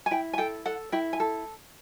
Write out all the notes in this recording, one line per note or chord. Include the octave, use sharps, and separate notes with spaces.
G#5
E4 G5
G#5
A4 G5
A4 F#5
E4 G5
G#5
A4